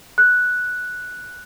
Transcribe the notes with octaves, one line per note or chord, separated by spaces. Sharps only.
F#6